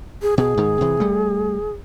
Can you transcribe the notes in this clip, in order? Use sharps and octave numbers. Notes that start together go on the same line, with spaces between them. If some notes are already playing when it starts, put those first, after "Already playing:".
G#4
B2 G#4
G#2 D#3
C3 E3
G3 A3